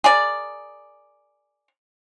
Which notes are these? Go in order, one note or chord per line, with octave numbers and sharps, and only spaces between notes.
G#4 A#4 D5